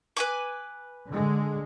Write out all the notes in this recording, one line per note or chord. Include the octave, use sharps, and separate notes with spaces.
B4 G#5 D6
D3 G#3